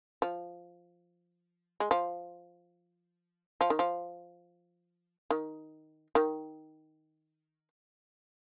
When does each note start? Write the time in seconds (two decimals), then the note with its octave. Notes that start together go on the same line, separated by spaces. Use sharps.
0.22 F3
1.80 G#3
1.91 F3
3.61 F3
3.70 D#3
3.79 F3
5.30 D#3
6.15 D#3